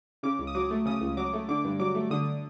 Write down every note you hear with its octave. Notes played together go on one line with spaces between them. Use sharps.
C#3 D6
C#2
D#6
F#3 D6
A3
C#3 D#6
C#2
F#3 D6
A3
D3 D6
G2
F#3 D6
A3
D3 D#6